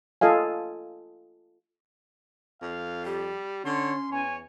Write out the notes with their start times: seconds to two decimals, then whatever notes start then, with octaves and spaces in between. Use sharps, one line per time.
0.21 F4 A4 D#5 F5 G#5
2.61 F2 F5
3.05 G3 G4
3.65 D3 C#4 C#5 C6
4.11 E2 C#5 G#5